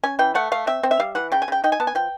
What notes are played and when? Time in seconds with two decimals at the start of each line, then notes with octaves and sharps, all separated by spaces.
0.03 C#4 G#5
0.19 E3 G5
0.35 A3 F#5
0.52 A3 F5
0.67 C4 E5
0.83 C4
0.91 E5
1.00 G3 F5
1.15 E3 F#5
1.32 C#3 G5
1.42 G#5
1.48 C#3 G5
1.64 D#4 G5
1.72 G#5
1.80 B3 A5
1.87 G#5
1.95 F3 G5